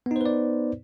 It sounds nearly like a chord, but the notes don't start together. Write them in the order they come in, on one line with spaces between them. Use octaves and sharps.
B3 D#4 C5 B4 D5